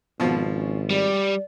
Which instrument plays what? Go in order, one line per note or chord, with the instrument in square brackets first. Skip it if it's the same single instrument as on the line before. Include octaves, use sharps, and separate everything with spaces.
[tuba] G#1 [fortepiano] B2 F3 [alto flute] B3
[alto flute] C#4
[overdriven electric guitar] G3 [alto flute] D5